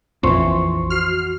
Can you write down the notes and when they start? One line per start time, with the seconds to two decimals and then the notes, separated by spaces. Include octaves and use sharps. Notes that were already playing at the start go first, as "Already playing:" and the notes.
0.23 A#1 F2 E3 C5 C6 C#6
0.90 F#4 F6 C7